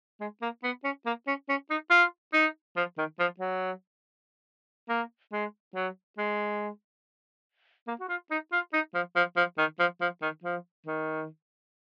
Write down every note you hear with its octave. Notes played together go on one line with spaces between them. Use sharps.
G#3
A#3
B3
C#4
A#3
C#4
C#4
D#4
F4
D#4
F3
D#3
F3
F#3
A#3
G#3
F#3
G#3
A#3
F#4
F4
D#4
F4
D#4
F3
F3
F3
D#3
F3
F3
D#3
F3
D#3